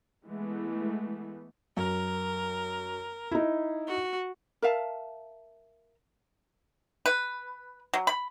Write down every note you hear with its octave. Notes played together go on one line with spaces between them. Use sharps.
E3 G#3 A3 B3
F#2 A#4
D#4 E4
F#4
A#4 E5 F5 A5
B4
F#3
B5